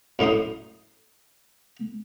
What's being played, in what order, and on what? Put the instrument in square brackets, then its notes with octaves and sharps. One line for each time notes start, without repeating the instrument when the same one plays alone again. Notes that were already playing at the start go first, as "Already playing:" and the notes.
[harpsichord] F#2 A2 D#4 C6 D#6